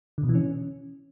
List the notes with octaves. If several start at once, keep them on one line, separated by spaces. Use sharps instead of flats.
D3
B2
E3
C#4